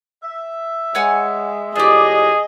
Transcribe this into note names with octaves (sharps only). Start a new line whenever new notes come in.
E5
G#3 C#5 F#5 G#5
A2 F3 D4 G4 G#4 D#5